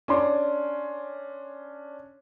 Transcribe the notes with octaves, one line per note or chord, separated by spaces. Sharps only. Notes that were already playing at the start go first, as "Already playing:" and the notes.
C#4 D4 C6 D6